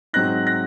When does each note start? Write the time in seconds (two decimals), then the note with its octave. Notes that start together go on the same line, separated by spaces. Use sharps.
0.13 G#2 F#3 C4 D#4 F#6 A#6
0.47 F#6 A#6